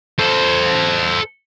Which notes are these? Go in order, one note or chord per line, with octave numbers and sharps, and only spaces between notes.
A4 C5